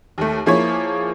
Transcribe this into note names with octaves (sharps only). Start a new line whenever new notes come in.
D#2 A3
F3 A#3 E4 G#4 C#5